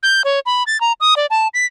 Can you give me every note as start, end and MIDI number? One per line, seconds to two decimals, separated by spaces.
0.03 0.22 91
0.24 0.40 73
0.46 0.63 83
0.67 0.80 93
0.81 0.93 82
1.00 1.14 87
1.16 1.26 74
1.30 1.48 81
1.54 1.66 95